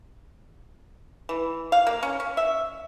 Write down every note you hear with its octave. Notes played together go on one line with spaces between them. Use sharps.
E3
F5
A#3
C#4
C#4
E5